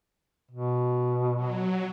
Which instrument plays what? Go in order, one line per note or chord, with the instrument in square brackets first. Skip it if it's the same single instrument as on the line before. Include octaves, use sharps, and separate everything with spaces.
[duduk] B2
[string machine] F#3